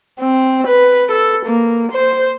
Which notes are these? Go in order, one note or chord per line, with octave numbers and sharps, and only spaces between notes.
C4
B4
A4
A#3
C5